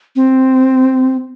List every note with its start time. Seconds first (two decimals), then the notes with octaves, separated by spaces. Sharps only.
0.16 C4